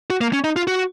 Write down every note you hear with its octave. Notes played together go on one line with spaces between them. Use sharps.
F#4
A#3
C#4
D#4
F4
F#4